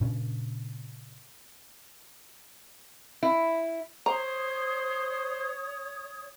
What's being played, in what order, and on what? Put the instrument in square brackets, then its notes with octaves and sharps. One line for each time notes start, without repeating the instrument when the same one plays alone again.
[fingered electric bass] A#2 C#3 C#4 D4
[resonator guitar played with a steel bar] E4
[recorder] C5 [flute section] C#5 D#6 [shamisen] A#5